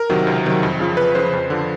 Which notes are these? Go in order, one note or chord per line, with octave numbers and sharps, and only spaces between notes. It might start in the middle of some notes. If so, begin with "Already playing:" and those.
Already playing: A#4
C3 D#3 F#3
C#2
C3 D#3 F#3
F2
C#3 F3
F2 B4
C#3 F3 C5
F2
D3 F3